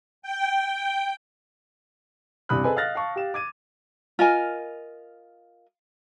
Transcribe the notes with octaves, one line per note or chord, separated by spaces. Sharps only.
G5
E2 G2 C3 B5 D#6 F#6
G#4 A4 B4 C5 D#5 G#5
D#5 F5 F6 F#6 A6 A#6
F5 A5 C#6
G4 F5 E7
D6 G#6 D#7
F4 A#4 D#5 G#5